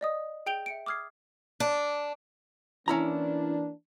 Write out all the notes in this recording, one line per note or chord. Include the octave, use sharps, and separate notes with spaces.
D5 D#5 D#6
G#4 G5 G6 D7 F7 G7
E5 C#7 D7
D6 D#6 F6 G#6 C7
D4
E3 A#3 C#4 D4 E4 A#5